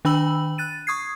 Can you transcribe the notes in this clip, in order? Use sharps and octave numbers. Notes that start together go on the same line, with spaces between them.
D#3 D4 G5 B5 E6 F#7
F#6 A6 D#7
C#6 D#6 G#6 C7